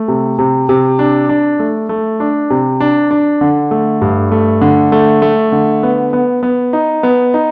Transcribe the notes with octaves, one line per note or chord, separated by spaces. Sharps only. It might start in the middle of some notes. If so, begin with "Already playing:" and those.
Already playing: A3
C3
C3
C3
D4
D4
A3
A3
D4
C3
D4
D4
D3
A3
G2
A3
D3
A3
A3
D3
B3
B3
B3
D#4
B3
D#4